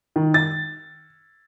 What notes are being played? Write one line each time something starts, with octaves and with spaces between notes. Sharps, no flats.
D#3
A6